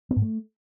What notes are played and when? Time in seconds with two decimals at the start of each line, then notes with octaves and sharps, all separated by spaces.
0.11 B3
0.16 G#2
0.22 A3